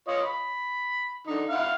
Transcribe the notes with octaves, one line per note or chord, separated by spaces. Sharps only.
F4 C#5 D#5
B5
D3 D#4
E4 F5 F#5